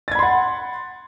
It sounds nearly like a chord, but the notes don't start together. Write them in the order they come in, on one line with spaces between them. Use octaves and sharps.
A6 G#6 B5 C6 F#5